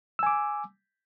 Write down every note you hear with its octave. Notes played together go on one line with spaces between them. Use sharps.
G#5 D6 E6